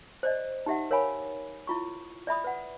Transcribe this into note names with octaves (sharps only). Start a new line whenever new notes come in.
C5 D5 D#5
D#4 G4 E5 F#5
A#4 C#5 F5 G#5 B5
E4 F4 C#6
D5 E5 B5 D#6
B4 F#5